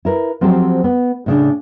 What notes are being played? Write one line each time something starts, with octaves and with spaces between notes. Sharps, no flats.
E4 A#4 B4
F3 F#3 C4 G4 A4 C5
B3
A2 C#3 D4